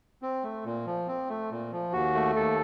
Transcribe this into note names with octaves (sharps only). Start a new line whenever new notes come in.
C4
A3
A#2
F3
C4
A3
A#2
F3
D#2 F#4
A3
D#2 A4